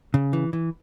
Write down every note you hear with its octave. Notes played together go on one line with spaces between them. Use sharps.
C#3
E3
E3